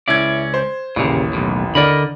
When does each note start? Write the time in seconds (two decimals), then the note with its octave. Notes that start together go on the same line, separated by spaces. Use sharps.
0.08 C#2 C#4 E4 D5 G#6
0.54 C5
0.96 A1 D#2 A#2 C#3
1.33 B1 E2 A2
1.75 D3 A#4 D5 D#5 B5